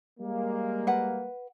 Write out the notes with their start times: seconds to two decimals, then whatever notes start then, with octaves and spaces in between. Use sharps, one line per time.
0.19 G3 G#3 A#3
0.87 B4 F#5